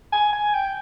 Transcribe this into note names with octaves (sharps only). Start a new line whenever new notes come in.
G#5
G#5
G5